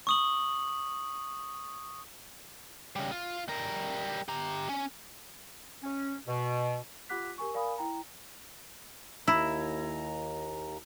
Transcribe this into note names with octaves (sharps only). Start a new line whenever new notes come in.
C#6 D#6 F#7
C#3 G3
F4
G3 A#4
G4 A#5
C#4
C#4
B2
F4 G4 F#5 D6 F#6 B6
G4 A#4 G#5 C#6
A#4 D5 F5 G#5 B5 D#6
E4 G5 A#5
D#2 E4 A#5